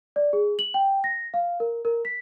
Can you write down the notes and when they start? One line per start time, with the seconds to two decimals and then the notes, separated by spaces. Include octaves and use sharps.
0.16 D5
0.33 G#4
0.59 F#7
0.74 G5
1.04 A#6
1.34 F5
1.60 A#4
1.85 A#4
2.05 B6